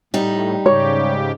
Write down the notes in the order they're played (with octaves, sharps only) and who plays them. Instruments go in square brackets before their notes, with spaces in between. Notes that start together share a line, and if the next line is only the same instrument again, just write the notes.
[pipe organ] A2 [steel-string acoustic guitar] G3 D#4
[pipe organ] G#2 C#3 G4 [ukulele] C#5